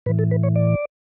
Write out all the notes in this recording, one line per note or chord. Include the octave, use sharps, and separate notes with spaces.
A2 E3 B4
A4
B4
C#5
D5